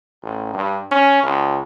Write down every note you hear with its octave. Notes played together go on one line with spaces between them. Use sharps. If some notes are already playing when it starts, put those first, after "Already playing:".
A1
G2
C#4
C#2